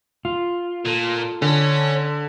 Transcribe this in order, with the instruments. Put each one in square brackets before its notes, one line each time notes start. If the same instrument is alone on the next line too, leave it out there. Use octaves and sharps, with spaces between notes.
[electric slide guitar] F4
[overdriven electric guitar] A#2 [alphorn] A4
[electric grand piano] D3 [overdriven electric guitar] C#4